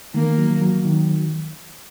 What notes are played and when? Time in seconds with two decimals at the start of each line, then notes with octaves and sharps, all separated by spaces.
0.14 D#3 A#3
0.38 F#3
0.61 F#3
0.85 D#3